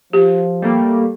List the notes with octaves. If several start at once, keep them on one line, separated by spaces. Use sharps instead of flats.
F3 G4
G3 A3 A#3